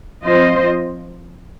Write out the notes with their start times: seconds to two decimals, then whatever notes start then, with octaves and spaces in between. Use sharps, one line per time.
0.23 F3 C4 F4 C5 D#5